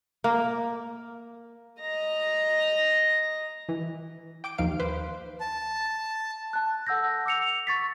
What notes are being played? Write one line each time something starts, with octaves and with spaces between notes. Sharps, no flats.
A#3
D#5 A#5
E3
G5 D6 G6 D7
D#2 D#3 F3 F5 D7
B4 C5 F5 C6
A5
A5 F#6
A4 F#5 E6 G6 A#6
D6 E6 C#7 F7
C#6 A6 B6